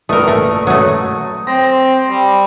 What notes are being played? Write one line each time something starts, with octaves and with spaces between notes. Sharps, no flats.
A#1 A3 A#4 B4 D#6
A3
F#3 A3 D#6
C4 A#6
G3